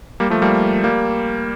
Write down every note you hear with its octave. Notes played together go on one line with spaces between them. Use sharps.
G3 A#3
F3 A3
G3 A#3
G3 A#3